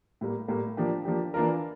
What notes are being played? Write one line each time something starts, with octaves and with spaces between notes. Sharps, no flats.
A2 G3 A#3
A2 G3 A#3
F3 A#3 D4 G4
F3 A#3 D4 G4
E3 A#3 D4 F4 A#4